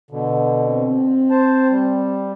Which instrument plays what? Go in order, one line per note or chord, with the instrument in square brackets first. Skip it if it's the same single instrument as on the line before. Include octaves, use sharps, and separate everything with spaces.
[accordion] B2 D3
[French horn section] C4
[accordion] C5 A5
G3